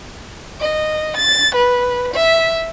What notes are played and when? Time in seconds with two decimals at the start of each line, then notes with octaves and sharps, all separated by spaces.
0.61 D#5
1.17 A6
1.55 B4
2.14 E5